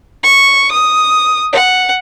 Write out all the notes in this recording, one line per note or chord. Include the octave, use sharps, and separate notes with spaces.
C#6
D#6
F#5